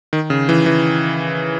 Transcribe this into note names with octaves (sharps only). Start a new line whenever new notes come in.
D#3
C#3
E3
E3